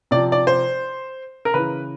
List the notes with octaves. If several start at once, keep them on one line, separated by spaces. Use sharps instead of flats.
C3 F3 D5
D5
C5
A#4
C#3 E3 B4